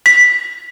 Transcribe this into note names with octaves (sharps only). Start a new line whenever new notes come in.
B6